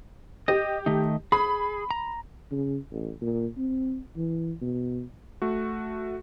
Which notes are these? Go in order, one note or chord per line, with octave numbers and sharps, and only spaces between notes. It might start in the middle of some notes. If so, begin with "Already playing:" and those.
G4 D#5
D#3 A3 D#4
G#4 B5
A#5
C#3
A1
A#2
C4
E3
B2
A3 F#4